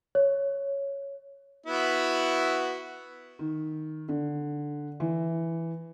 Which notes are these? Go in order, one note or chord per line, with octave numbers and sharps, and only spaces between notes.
C#5
B3 E4 F#4
D#3
D3
E3